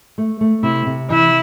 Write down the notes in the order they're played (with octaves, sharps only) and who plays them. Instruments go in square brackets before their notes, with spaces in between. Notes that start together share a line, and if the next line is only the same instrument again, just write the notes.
[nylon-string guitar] A3
A3
[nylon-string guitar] C3 [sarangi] E4
[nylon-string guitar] C3
[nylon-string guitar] E3 [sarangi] E4